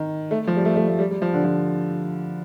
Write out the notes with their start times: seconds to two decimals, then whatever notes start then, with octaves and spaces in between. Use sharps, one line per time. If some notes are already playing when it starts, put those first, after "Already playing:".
Already playing: D#3
0.31 A3
0.47 F3
0.57 G3
0.65 A3
0.76 A3
0.88 A3
0.99 G3
1.11 G3
1.22 F3
1.34 D3
1.44 F3